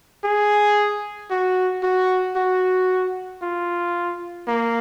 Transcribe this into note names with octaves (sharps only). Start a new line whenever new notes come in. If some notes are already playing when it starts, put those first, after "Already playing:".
G#4
F#4
F#4
F#4
F4
A#3